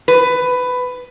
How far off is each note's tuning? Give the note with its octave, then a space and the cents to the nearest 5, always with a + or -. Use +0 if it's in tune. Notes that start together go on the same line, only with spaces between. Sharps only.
B4 +15